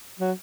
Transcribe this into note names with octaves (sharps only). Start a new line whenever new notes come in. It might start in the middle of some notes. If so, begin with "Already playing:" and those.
F#3